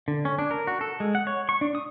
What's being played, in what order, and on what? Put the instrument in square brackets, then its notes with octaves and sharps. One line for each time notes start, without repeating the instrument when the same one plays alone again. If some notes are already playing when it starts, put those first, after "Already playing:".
[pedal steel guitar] D3
C#4
D4
A#4
F#4
A4
G#3
F#5
C#5
C#6
D4
D#6